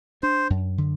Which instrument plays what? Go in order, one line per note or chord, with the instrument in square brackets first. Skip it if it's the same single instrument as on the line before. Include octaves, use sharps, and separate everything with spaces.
[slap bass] D4 [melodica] C5
[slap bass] F#2
D3